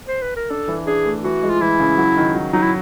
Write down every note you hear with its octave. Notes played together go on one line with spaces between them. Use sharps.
C5
B4
A#4
D4 A4
E3
D4 G#4
A3
E3 F#4
G#3
F4
E3 E4
C#3
F#3
D#3
F#3
F#3 D#4
E4